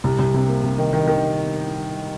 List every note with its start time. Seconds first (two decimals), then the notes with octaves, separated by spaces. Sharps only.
0.04 C2
0.19 C2
0.34 C3
0.48 A#3
0.64 C3
0.78 D#3
0.93 D#3
1.07 D#3